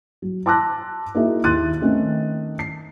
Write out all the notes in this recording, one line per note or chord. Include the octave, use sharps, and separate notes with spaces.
F#3
A5 C6 D6 E6 F#6 A#6
A#3 D#4 E4 F#4 G#4 E5
D#2 E4 C6 F#6 A6 D#7
D#3 A3 C4 C#4 D#4
C7